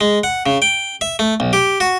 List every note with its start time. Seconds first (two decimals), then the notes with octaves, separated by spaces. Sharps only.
0.01 G#3
0.24 F#5
0.46 C#3
0.62 G5
1.01 E5
1.19 A3
1.40 B1
1.53 G4
1.80 F#4